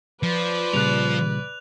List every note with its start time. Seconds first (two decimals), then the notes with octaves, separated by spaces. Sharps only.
0.23 F3 B4 D5
0.74 A#2 C#3 G3 F#6 F7